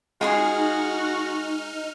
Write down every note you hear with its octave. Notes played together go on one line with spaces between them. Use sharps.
G#3 D#4 F4 F#4 G#4 C6 F6